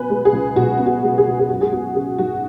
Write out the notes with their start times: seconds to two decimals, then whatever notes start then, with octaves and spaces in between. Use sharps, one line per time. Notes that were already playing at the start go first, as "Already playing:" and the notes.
Already playing: B2 B3 B4 G#5
0.10 G#3
0.25 G#4
0.33 C#2
0.56 B2 F#4
0.79 B3
0.86 F#4
1.03 G#3
1.18 G#4
1.25 C#2
1.40 G#4
1.48 F#2 F#4
1.61 G#4
1.72 B3 F#4
1.95 C#3 G#4
2.18 G#1 F#4